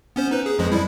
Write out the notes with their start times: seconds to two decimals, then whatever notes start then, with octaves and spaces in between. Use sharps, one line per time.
0.16 B3 C#4 C5
0.31 D#4 B4
0.46 G#4
0.59 F2 F3 G#3
0.72 G3 E4